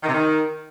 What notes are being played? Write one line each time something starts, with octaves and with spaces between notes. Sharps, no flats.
D#3
C3
D#3